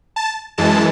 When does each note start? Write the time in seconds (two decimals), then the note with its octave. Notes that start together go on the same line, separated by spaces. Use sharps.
0.16 A5
0.58 F#2 E3 G#3 A5